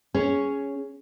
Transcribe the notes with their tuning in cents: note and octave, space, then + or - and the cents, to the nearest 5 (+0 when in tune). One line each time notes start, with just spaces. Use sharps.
C#4 +5 G#4 +0 C#5 +0